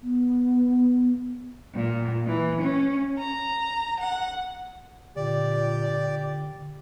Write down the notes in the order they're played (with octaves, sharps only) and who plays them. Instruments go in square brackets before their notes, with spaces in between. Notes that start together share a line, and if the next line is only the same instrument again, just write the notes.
[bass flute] B3
[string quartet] A#2
E3
C#4
A#5
F#5
[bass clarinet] A#2 [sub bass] D3 [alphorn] G4 [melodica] D5